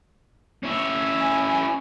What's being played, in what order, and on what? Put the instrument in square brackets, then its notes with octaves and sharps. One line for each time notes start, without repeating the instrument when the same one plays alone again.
[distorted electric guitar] C#4 E4
[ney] G#5